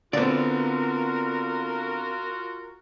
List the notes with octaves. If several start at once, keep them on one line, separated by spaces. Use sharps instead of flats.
D3 B3 C4 F4 F#4 A#4 D5